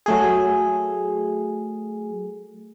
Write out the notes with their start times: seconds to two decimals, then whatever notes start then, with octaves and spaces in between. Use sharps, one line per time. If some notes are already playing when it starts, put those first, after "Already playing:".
0.06 F#3 A3 G#4